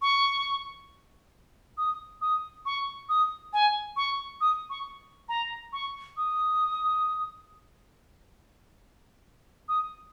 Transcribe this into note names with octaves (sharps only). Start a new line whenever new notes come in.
C#6
D#6
D#6
C#6
D#6
G#5
C#6
D#6
C#6
A#5
C#6
D#6
D#6